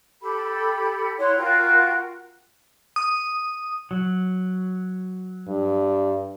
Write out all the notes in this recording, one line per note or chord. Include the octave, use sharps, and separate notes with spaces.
G4 A4 B5
E4 C#5 F#5 C6
F4 F#4 A#4 G5
D#6
F#3
G2